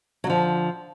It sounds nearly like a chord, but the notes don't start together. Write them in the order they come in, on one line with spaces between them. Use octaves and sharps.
F#3 D3 F3